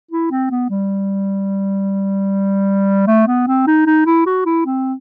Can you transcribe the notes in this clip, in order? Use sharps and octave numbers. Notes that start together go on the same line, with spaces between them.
E4
C4
B3
G3
A3
B3
C4
D#4
D#4
E4
F#4
E4
C4